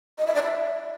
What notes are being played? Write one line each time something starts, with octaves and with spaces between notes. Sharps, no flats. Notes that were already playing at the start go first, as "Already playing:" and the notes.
D#5
E5
D5
E5